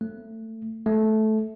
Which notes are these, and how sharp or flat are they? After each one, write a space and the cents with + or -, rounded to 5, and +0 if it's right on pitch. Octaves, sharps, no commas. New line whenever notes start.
A3 +20
A3 -15